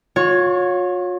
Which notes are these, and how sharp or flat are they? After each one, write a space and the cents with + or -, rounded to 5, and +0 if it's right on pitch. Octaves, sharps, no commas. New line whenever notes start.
F4 +45 C#5 +0